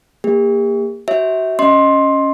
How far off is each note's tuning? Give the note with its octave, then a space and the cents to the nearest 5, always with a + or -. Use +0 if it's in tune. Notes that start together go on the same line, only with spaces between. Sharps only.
A#3 +0 G4 +45
F#4 +30 C#5 +0 E5 -25
C#4 +0 D#5 +0 C6 +15